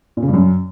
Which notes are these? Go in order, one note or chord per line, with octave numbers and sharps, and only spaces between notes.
A#2
C#3
G2
F#2